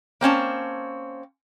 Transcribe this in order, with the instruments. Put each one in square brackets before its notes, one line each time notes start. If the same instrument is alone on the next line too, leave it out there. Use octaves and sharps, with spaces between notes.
[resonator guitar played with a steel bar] A#3 C4 C#4 A5